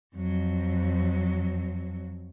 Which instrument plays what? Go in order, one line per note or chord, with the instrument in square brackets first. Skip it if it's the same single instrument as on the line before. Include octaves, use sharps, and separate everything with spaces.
[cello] F2 F#3